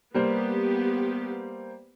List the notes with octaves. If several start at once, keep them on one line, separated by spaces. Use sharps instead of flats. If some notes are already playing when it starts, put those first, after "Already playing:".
G3 A#3 B3 G4 C5